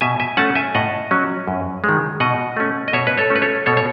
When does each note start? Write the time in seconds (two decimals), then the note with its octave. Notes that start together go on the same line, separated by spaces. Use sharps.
0.01 B2 E5 G#5
0.20 E5 G#5
0.37 A3 C#4 F#5 A5
0.55 E5 G#5
0.75 A2 D#5 F#5
1.11 F#3 C#4
1.48 F#2
1.84 D#3 G#3
2.20 B2 D#5 F#5
2.57 A3 C#4
2.88 D#5
2.93 B2 C#5 E5
3.07 B4
3.17 A4 C#5
3.30 A3 C#4
3.36 B4
3.42 A4 C#5
3.66 B2 A4 C#5
3.77 C#5